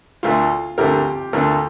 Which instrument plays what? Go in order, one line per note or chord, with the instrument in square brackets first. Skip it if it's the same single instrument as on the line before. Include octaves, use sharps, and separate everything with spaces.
[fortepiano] D2 D3 A3 E4 A#4 [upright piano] F4
[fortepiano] D2 D3 A3 E4 A#4 [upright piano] G4
[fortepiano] D2 D3 A3 E4 A#4